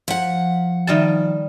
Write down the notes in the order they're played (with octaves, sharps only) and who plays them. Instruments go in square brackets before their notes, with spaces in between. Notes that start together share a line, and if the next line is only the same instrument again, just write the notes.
[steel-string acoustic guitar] F3 F#5
[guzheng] D#3 G3 A5